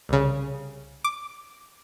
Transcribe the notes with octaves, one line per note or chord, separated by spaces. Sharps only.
C2 C#3
D6